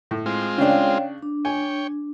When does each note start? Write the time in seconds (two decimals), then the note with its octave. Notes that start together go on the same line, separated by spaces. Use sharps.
0.11 A2
0.26 G#3 C4 F4
0.58 C#3 D4 C#5 F5 G5
1.22 D4
1.45 C#5 G5 G#5